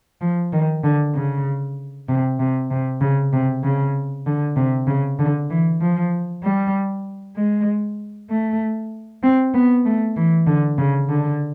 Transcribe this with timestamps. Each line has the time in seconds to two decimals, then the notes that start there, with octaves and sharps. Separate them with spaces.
0.21 F3
0.53 D#3
0.84 D3
1.14 C#3
2.09 C3
2.40 C3
2.71 C3
3.01 C#3
3.33 C3
3.63 C#3
4.26 D3
4.56 C3
4.87 C#3
5.19 D3
5.50 E3
5.81 F3
6.43 G3
7.37 G#3
8.30 A3
9.23 C4
9.54 B3
9.85 A3
10.16 E3
10.47 D3
10.78 C#3
11.09 D3